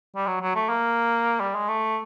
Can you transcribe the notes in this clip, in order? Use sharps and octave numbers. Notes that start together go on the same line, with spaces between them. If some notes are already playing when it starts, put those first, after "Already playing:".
G3
F#3
F#3
A3
A#3
G3
G#3
A3